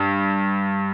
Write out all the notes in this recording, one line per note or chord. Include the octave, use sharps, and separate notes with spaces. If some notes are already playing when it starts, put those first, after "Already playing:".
Already playing: G2